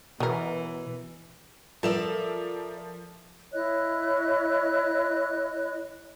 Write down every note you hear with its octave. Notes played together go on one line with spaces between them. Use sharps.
B2 E3 F#3 A#4
F3 A4 A#4 D5 E5 E7
E4 C#5 D#5 F#6